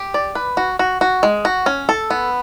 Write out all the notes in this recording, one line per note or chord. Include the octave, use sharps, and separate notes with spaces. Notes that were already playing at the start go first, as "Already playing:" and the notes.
Already playing: G4
D5
B4
F#4
F#4
F#4
G#3
F#4
C#4
A4
B3